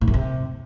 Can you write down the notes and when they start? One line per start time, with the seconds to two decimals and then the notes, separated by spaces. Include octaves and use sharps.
0.01 G#2
0.08 F#2
0.14 C3